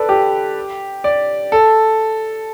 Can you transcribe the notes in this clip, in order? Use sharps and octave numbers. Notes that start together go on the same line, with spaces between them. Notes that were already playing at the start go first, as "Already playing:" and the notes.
Already playing: A4 B4 D5
G4
D5
A4